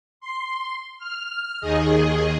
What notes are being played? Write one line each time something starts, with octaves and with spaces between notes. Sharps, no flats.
C6
F6
D#2 D#3 G#4 D#5